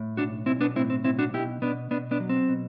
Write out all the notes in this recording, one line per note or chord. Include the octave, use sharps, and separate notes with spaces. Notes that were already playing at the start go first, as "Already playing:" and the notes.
Already playing: A2
B1 D4 F#4
B1 C4 E4
B3 D4
A2 C4 E4
C4
B1 C4 E4
D4 F#4
B2 E4 G4
B2 B3 D4
B2 B3 D4
B3 D4
F#3
C4
B2